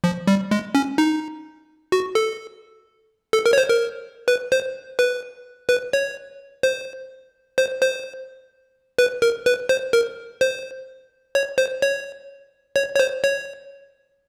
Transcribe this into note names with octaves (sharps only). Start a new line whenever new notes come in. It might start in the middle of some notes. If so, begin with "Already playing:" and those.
F3
G3
G#3
C#4
D#4
F#4
A4
A4
A#4
C#5
C5
A#4
B4
C5
B4
B4
C#5
C5
C5
C5
B4
A#4
B4
C5
A#4
C5
C#5
C5
C#5
C#5
C#5
C5
C#5